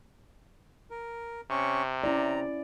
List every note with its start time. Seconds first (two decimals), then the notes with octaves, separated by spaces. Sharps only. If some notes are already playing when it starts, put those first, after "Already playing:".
0.90 A#4
1.50 C3 C#4 C#6
2.04 C#4 E4 D5 A#5